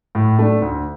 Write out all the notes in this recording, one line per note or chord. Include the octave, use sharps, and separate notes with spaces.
A2
A3 D4
D2